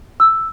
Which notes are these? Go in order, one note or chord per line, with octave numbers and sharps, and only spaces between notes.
E6